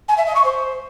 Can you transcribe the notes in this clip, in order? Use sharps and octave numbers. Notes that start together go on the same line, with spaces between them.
G#5
E5
D#5
C#6
C5